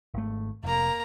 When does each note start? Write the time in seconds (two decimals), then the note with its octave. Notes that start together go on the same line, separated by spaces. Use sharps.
0.14 G#1 A3
0.64 F1 A#3 A#5